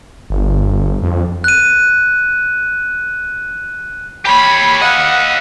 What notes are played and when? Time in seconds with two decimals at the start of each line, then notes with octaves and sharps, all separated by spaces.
0.30 G1
1.02 F2
1.44 F#6 D#7
4.25 G4 C#5 B5
4.82 D#5 F5 F#5